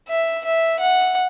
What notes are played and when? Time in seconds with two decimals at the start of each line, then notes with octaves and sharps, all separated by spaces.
0.09 E5
0.45 E5
0.80 F#5